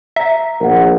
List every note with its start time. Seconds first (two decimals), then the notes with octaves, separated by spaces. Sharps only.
0.16 E5 A#5
0.60 A#1 A#4 F#5